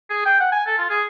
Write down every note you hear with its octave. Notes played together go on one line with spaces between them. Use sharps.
G#4
G5
F#5
G#5
A4
F4
G#4